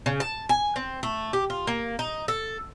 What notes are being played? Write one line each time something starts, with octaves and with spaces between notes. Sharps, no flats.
C#3
A5
G#5
C4
A3
G4
F4
A#3
D#4
A4